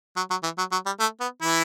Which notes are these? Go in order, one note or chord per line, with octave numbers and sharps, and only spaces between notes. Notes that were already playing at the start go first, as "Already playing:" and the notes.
F#3
F#3
E3
F#3
F#3
G3
A3
B3
E3 E4